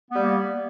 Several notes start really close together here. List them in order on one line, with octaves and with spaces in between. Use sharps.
B3 G3 A#3